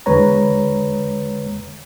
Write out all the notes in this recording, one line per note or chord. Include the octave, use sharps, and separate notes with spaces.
E2 D3 G#3 B4 C#5 A#5